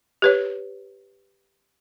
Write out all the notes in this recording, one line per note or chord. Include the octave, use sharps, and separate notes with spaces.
G4 B4 C#5